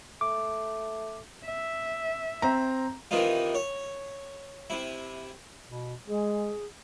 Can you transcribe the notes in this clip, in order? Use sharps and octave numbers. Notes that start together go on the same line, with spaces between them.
A3 D6
E5
C4 A#5
C3 D#3 E3 D#4 F4
C#5
C3 E4
B2
G#3 G#4